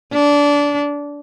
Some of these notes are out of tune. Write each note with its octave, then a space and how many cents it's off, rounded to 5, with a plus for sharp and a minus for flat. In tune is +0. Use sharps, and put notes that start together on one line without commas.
D4 -20